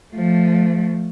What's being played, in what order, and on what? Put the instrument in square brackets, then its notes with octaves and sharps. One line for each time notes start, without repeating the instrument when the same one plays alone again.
[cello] F3 A3